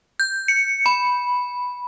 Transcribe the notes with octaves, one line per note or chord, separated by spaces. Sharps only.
G6
C#7
B5